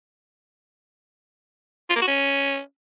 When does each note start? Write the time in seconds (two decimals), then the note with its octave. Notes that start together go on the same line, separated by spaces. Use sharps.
1.90 F4
1.96 A#3
2.02 F#4
2.07 C#4